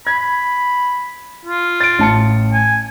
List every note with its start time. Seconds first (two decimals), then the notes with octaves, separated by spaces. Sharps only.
0.07 B5 G#6
1.45 F4
1.80 A6 D7
1.99 A1 A5 C#7
2.53 G#5